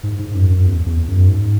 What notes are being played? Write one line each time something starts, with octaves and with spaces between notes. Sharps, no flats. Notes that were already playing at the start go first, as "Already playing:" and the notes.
G#2
G#2
F#2
F#2
E2
E2
F#2
G#2